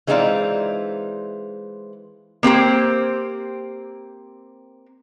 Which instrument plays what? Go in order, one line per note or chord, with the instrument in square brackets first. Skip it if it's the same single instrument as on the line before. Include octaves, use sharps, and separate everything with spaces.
[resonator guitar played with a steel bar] E3 G#3 C4 D#4 F4 D5
A#3 C4 G4 C5